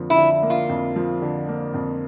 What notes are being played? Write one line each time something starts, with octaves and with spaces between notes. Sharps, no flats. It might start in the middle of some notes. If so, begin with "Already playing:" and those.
Already playing: F2 D3 F3 A#3
E4
D3
A#3
F4
F2
F3
D3
A#3
F2